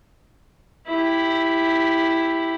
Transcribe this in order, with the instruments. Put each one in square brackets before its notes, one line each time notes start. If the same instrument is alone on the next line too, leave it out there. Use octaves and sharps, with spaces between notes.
[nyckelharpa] E4 G4